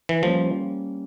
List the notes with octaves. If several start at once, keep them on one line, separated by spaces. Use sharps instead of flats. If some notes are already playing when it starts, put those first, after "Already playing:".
E3
F3 G3 A#3 C#4